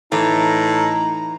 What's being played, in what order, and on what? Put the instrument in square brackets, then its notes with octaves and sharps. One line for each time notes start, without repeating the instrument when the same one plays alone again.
[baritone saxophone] A2 [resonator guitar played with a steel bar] E3 [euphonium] D#4 [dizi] A#5